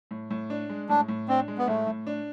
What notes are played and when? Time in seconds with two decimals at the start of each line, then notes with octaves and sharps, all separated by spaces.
0.11 A2
0.30 A2
0.50 D4
0.69 G#3
0.89 A2 D4
1.08 A2
1.28 C4 D4
1.48 G#3
1.58 B3
1.67 A2 A3
1.87 A2
2.07 D4